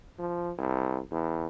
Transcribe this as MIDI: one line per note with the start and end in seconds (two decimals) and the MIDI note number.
0.19 0.52 53
0.58 1.00 36
1.11 1.47 40